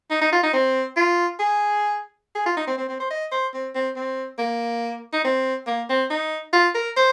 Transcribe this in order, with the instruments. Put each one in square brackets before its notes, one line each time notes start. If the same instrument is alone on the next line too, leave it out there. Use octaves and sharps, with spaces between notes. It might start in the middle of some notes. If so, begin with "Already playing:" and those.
[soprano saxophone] D#4
D#4
F4
D#4
C4
F4
G#4
G#4
F4
D#4
C4
C4
C4
C5
D#5
C5
C4
C4
C4
A#3
D#4
C4
A#3
C4
D#4
F4
A#4
C5